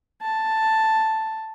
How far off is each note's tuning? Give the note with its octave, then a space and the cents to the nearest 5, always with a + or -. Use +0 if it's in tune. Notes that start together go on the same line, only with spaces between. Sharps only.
A5 +5